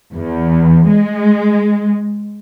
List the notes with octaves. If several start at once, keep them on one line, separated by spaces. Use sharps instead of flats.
E2
G#3